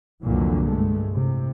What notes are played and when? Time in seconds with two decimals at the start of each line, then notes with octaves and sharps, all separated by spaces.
0.24 C2 F2 A#2 D3 E3 F#3
0.63 G2 G#3 A3
1.12 A2 C3